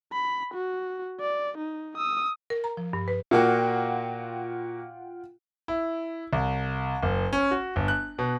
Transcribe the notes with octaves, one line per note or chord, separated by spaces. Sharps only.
B5
F#4
D5
D#4
D#6 E6
A#4
A#5
F3
G2
B4
A#2 A#3 F4 F#4 F#5 G5
E4
C2
F#1
C#4
F#4
G1
F#6
B2